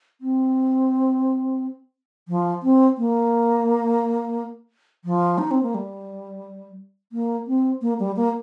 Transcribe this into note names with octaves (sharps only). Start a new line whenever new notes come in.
C4
F3
C4
A#3
F3
D#4
C4
A#3
G3
A#3
C4
A#3
G3
A#3